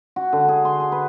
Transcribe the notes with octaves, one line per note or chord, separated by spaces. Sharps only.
F#4
D3
G#4
C6
G#4
B4